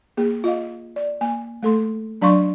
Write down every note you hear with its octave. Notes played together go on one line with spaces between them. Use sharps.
A#3 G#4
F4 D#5 F5
D5
A#3 G#5
A3 A4 C6
F#3 D4 D5 F5 C6 C#6